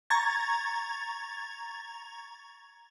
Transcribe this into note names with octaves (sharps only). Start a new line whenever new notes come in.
A#5 C#6 G#6 A6